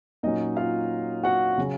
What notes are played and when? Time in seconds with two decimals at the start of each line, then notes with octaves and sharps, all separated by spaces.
0.23 A#2 F#3 C#4 D#4 D#5
0.57 F4 F5
1.23 F#4 F#5
1.58 C#3 F#3 C#4